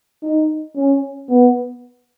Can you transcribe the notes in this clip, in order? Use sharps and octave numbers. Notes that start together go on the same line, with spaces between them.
D#4
C#4
B3